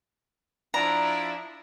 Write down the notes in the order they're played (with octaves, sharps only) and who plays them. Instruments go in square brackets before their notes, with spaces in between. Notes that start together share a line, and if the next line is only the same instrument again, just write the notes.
[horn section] F3 D4 E4 [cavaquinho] A#5